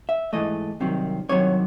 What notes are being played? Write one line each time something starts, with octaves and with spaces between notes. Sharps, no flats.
E5
G#2 E3 A3 D#5
C2 C3 D#3 F#3
C2 C3 D#3 F#3 C#5